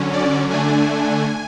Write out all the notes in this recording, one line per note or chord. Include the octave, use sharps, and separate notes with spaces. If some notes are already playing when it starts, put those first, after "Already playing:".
Already playing: D3 F#3 C#4
D5
D3 A3 D4 G#5